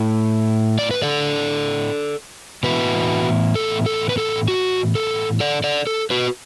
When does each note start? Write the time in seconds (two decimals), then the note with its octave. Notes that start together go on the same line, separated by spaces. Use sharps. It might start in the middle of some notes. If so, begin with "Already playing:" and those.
Already playing: A2 A3 E4
0.79 D5
0.91 B4
1.02 A4 D5
2.63 A2 E3 B3 E4 F#4 B4
3.55 A4
3.86 A4
4.09 B4
4.18 A4
4.48 F#4
4.95 A4
5.40 A4 D5
5.64 A4 D5
5.87 A4
6.10 F#4 B4